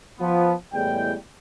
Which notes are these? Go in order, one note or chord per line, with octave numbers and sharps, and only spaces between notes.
F3 B3
E2 A2 G3 G#3 G5